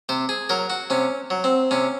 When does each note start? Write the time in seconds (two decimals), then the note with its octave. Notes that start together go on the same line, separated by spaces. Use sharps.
0.09 C3 C5
0.29 G#4
0.49 F#3 A#4
0.70 F#4
0.90 C3 C#4
1.30 F#3
1.44 C4
1.71 C3 C#4